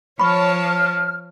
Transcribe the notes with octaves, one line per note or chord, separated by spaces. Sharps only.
F3 C#5 A5 B5 C#6 F6